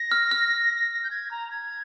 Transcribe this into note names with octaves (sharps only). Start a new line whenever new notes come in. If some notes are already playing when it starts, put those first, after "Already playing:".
Already playing: A#6
F6
F6
A#6
G6
G#6
A#5
G#6